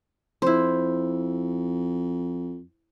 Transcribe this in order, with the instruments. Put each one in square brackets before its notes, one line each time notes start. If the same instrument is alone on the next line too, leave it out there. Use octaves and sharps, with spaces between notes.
[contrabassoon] F2 [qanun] E4 C5